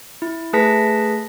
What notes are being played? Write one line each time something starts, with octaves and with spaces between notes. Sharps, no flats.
E4
A3 G#4 B4 A5 A#6 B6